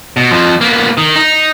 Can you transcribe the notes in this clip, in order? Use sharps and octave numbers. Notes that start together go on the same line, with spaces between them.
B2
F2 F3
A#3 B3
D#3
D#4